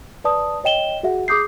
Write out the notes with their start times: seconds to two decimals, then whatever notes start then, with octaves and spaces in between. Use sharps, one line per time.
0.24 B4 D5 A5 D#6
0.64 C#5 D#5 G5 E7 G7
1.03 F#4 G#4 E5 F#5
1.28 G#4 D6 D#6 G6 C7